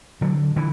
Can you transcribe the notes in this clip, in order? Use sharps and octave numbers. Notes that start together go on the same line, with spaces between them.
D3 F#3
D3 E3